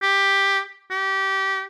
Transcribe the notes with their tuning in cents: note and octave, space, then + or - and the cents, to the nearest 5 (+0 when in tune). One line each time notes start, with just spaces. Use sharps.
G4 +5
G4 -20